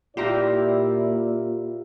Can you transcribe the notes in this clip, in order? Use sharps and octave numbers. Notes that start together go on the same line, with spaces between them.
A#2 E4 F4 G4 D5 E5 A#5